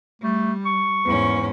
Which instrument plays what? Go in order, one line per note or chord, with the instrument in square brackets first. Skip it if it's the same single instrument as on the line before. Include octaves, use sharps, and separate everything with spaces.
[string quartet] G3 [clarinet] A3
[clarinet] C#6
[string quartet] E2 G#2 C#4